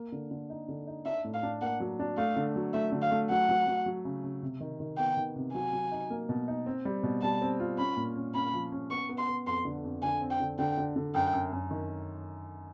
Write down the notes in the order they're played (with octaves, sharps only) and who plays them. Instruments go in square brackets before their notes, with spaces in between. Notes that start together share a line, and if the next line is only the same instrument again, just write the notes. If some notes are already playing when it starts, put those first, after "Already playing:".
Already playing: [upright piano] A#3
D3
D3
D#4
D3
D#4
[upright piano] D4 [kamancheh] E5
[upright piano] A2
[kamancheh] F5
[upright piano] D4
[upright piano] A#3 [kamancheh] F#5
[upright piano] F#3
D4
[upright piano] A3 [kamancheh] F5
[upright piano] D3
F#3
[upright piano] A3 [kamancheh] E5
[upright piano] D3
[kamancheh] F5
[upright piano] A3
[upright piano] F#3 [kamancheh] F#5
[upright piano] F#3
F#3
F#3
C#3
C#3
C3
D#3
D#3
[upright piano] B3 [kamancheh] G5
[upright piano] D#3
C3
[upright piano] F#3 [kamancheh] G#5
[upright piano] F#3
D#4
A#3
B2
D#4
C4
G3
B2
[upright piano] G3 [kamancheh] A5
[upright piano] C4
F4
[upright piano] C#4 [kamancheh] B5
[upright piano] A#2
C#4
[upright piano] C#4 [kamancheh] B5
[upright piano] F3
C#4
[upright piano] B3 [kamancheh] C#6
[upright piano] B3
[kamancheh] C6
[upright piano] B3
[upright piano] F2 [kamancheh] C6
[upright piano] D3
F2
[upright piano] D3 [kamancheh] G#5
[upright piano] C4
[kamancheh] G5
[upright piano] D3
[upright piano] D3 [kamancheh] G5
[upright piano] D3
D3
[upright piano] F#2 [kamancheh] G5
[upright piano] F#2
F#2
D#3